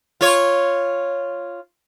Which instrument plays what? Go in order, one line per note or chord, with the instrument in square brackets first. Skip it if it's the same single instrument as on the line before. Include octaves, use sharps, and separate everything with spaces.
[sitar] F4 C#5